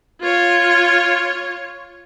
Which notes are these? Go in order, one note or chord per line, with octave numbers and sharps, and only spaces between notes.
F4 C#5